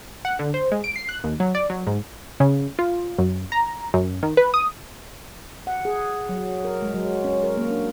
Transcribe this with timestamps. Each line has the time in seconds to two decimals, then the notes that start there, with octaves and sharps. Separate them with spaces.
0.25 F#5
0.39 D3
0.54 C5
0.72 G#3
0.84 D7
0.96 C7
1.09 F#6
1.24 D#2
1.40 F#3
1.55 D5
1.70 F#3
1.87 G#2
2.40 C#3
2.79 F4
3.18 F#2
3.52 A#5
3.94 F#2
4.23 D#3
4.37 B4
4.54 D#6
5.67 F#5
5.85 G#4
6.29 F#3
6.65 A#4
6.82 G#3
6.94 F#3
7.24 C#4
7.43 A#4
7.57 A#3
7.70 D4